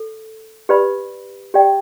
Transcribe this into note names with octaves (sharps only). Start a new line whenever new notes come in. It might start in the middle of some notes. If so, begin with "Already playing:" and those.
Already playing: A4
G4 B4 D5 B5
G4 D5 G5